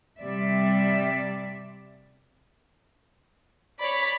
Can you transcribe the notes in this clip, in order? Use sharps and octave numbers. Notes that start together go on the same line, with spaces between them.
C3 G3 D5 E5
C#5 D5 B5